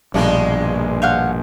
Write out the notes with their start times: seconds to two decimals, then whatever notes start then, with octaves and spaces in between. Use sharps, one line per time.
0.14 A#1 G2 B2 D#3 G#3 A#3 B3 D4
1.02 C#5 F5 F#5 G6